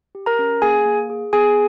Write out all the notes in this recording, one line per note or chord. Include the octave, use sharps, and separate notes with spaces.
G4
A#4 A#5
C#4
A#3 G#4 G#5
A#3
G#4
B3 G#4 G#5